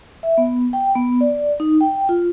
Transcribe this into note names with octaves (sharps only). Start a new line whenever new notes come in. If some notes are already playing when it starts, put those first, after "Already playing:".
E5
B3
G5
B3
D5
D#4
G5
F4